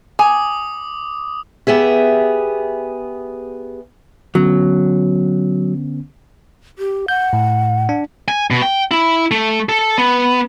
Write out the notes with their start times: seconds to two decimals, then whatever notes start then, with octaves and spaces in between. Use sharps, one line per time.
0.19 G#5 D6 D#6
1.67 B3 G4 G#4 E5
4.35 D3 F#3 B3 C#4
6.79 G4
7.08 F#5 G6
7.33 A2
7.89 D4
8.28 G#5
8.51 B2
8.62 G5
8.91 E4
9.31 A3
9.69 A4
9.98 B3